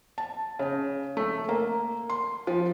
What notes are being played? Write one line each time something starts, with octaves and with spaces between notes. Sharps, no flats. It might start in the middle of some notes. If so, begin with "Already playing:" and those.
A5
C#3
A3
A#3
C6
F3